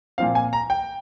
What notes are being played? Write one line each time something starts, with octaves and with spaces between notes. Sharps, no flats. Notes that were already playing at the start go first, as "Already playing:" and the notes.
A#2 F3 C4 F5
G#5
A#5
G5